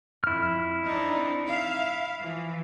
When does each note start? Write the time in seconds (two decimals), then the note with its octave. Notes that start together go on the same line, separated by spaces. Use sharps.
0.24 F2 E4 F6
0.84 C4 D4 D#4
1.47 E5 F5
2.19 E3 F3